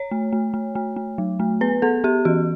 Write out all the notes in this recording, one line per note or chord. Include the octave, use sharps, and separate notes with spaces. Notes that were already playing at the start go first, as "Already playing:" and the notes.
Already playing: C#5
A3
A3
A3
A3
A3
F#3
A3
B3 B4
B3 A4
B3 G4
E3 F#4